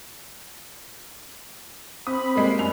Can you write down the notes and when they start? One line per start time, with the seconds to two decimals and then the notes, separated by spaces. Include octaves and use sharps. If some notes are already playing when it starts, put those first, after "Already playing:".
2.07 C4 B5 D#6
2.36 G3 G#3 A#3
2.59 F#2 G#3 F7